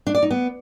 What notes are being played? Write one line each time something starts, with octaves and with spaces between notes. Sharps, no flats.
D4
D5
D#4
B3